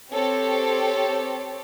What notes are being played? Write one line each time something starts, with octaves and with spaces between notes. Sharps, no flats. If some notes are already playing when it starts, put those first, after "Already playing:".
C4 G4 A4 C#5